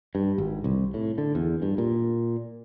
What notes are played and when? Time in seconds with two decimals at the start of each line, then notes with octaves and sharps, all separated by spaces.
0.15 G2
0.38 G#1
0.64 C2
0.94 A2
1.18 D3
1.35 E2
1.62 G2
1.78 A#2